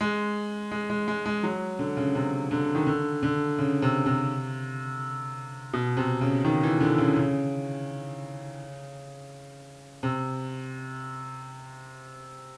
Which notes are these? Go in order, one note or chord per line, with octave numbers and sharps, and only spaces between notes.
G#3
G#3
G#3
G#3
G#3
F#3
D3
C#3
C3
D3
D#3
D3
D3
C#3
C3
C3
B2
C3
C#3
D#3
E3
D3
C#3
C#3
C3